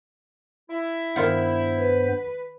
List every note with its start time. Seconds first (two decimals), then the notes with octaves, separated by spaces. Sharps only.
0.70 E4
1.16 G2 D#3 B3 F4 C5 F#5
1.76 B4